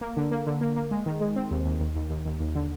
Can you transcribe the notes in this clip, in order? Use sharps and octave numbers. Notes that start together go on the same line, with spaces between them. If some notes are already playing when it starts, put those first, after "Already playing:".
A#3
D3
A#3
D3
A#3
A#3
G#3
D#3
G#3
C4
D#2
D#2
D#2
D#2
D#2
D#2
D#2
D3